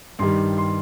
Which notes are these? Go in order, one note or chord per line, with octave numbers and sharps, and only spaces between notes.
G2 D#3 G3 C6
C6